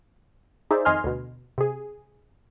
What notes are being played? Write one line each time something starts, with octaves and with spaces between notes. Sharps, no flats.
D#4 G#4 C5 D5 E5
F2 D#3 D#5 G#5 C6 F6
D2 B2
C3 G#4